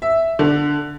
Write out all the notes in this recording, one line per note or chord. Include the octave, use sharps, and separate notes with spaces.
E5
D3